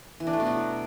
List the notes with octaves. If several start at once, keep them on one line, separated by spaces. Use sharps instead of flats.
E3
D4
A3
B2
F#3